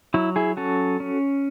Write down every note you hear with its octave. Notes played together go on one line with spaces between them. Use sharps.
F#3 E4
E4 G#4
C#4 F#4 A4
C#4